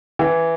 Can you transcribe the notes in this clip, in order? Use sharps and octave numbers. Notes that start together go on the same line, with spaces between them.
E3